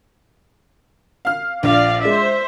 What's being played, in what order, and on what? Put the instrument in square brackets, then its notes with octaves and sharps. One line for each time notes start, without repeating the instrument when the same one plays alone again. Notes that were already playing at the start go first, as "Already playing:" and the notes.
[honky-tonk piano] F5 F6
[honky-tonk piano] A#1 [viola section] D5 F5
[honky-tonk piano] G#3 [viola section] C5 E5